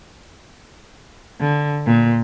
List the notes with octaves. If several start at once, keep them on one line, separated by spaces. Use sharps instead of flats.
D3
A#2